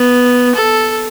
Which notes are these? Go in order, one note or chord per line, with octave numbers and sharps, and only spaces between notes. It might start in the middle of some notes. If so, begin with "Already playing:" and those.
Already playing: B3
A4